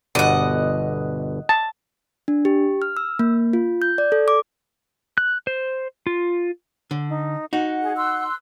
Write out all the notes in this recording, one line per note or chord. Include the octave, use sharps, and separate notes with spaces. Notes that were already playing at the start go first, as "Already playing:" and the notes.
G1 B2 D5 D#5 F#5
A5
D4
G4
F6
E6
A#3
F4
G6
D5
A4
D6
F#6
C5
F4
D3
D#4
D#4 F#4 F#5
G#4
C6 E6 F#6